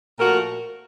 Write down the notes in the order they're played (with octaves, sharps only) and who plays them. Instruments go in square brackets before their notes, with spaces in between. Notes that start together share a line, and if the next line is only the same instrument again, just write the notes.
[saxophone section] A#2 F3 A3 F#4 A#4